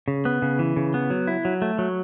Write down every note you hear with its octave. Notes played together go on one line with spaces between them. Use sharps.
C#3
B3
C#3
E3
C#3
B3
F#3
E4
F#3
A3
F#3